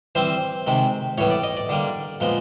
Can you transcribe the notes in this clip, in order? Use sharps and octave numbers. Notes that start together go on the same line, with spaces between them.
E3 G3 C4 C5
C3 D#3 G#3
A2 E3 G3 B3 C#5
D5
D#5
D5
D3 G3 A#3
A#2 F3 G#3 B3